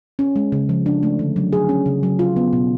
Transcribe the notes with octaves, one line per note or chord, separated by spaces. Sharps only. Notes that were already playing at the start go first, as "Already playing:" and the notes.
C#4
G#3
C#3
F3
D4
A3
D3
F#3
G#4
C#4
C#3
F#3
F4
B3
B2